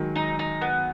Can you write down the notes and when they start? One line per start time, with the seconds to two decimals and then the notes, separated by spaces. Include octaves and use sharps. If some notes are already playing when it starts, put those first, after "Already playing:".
Already playing: D#3 F#3 G#3
0.16 D#4
0.39 D#4
0.61 B3